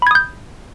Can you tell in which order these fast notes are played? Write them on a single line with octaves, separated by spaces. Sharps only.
B5 G#6 D#6 G6